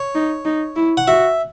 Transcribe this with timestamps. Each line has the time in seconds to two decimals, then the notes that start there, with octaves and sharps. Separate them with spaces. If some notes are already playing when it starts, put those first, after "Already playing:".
Already playing: C#5
0.15 D#4
0.45 D#4
0.76 E4
0.97 F#5
1.08 F#4 E5